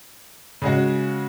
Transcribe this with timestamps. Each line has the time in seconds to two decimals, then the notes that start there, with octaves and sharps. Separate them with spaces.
0.62 C#3 G#3 C#4 F#4